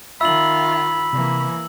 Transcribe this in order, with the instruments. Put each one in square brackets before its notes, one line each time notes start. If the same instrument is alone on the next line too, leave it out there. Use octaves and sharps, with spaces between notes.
[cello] D#3 F4 [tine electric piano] E5 [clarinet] B5 [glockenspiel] E6 F#7
[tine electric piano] C3 [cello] E3 A#3